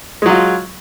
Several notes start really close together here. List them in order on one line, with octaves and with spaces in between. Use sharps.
G#3 F#3 F4